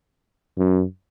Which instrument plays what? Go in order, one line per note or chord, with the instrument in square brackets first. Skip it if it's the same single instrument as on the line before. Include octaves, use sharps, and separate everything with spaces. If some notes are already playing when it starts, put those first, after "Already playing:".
[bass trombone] F#2